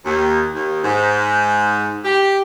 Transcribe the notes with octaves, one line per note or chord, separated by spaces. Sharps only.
D#2
D#2
G#2
G4